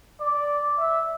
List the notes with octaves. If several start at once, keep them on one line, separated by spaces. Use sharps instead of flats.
D5
E5